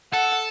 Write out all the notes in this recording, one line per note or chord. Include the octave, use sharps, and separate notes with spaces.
A4 F#5